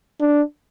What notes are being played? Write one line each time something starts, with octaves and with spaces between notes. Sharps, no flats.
D4